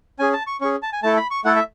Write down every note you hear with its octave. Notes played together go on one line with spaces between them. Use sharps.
C#4 G#4 G#5
A5
C#6
C#4 G#4 C#6
A5
G#5
A3 E4 A4 A5
B5
C#6
A3 E4 A4 F#5
E5